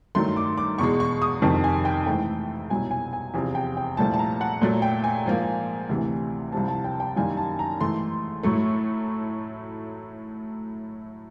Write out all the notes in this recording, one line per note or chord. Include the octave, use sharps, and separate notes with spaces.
G2 D#3 F#3 A3 C6
D6
D6
E2 B2 G#3 C#6
C#6
D#6
F2 C3 D#3 A5
G#5
G5
G#2 E3 A3 G5
C2 B2 F#3 G#5
G#5
G#5
E2 C3 F3 G#5
G5
G5
C2 A#2 F3 A3 A5
A5
A#5
F#5
A#2 F#3 A3
G5
G#5
G#2 F3 A#3
D2 C3 E3
C2 C3 F3 A5
A5
G5
G5
F#2 D#3 G3 A#3 G#5
A5
A#5
G#2 E3 A3 C6
A2 F#3 A3 C#6